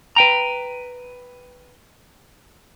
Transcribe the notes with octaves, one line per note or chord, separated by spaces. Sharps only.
B4 G5 A#5